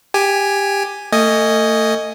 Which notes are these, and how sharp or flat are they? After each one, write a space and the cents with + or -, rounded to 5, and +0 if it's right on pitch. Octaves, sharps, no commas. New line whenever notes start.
G4 +15 G#5 +0
A3 +35 D#5 +0 G#5 +0